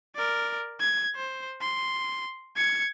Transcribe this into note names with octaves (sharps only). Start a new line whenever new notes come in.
A#4 D5
G#6
C5
C6
G#6 C#7